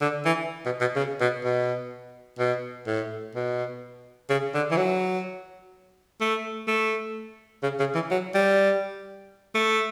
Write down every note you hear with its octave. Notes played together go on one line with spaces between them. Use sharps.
D3
E3
B2
B2
C#3
B2
B2
B2
A2
B2
C#3
D3
E3
F#3
A3
A3
C#3
C#3
E3
F#3
G3
A3